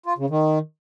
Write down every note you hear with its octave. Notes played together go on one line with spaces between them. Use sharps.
F4
C#3
D#3